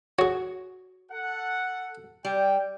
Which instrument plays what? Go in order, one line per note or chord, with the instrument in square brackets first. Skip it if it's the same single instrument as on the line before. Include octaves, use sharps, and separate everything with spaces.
[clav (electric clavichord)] F#4 [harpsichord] G#4 C#5
[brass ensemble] A4 F#5
[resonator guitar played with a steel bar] G3 [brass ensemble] G5